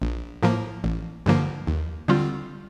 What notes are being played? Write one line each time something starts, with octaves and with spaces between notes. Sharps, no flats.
A#1
A2 F3 A#3
A1
G2 D3 F3 A#3
D#2
D3 G3 C4 F4